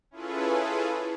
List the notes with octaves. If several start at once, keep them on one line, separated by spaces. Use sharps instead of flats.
C#4 E4 F4 G#4 A4 B4